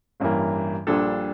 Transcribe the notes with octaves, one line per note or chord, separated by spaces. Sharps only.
A1 G2 E3 A#3
A#1 A#2 G3 D4 A4